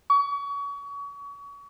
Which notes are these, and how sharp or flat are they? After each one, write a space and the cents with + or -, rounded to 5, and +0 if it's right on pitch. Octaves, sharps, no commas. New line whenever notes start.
C#6 +35